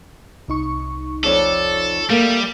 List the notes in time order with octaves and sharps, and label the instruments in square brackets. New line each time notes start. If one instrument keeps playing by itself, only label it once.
[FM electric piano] C2 D#4 C#6
[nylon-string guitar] F2 C#5 D5 [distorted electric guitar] A4
[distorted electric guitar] G3 [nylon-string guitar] A3 A#3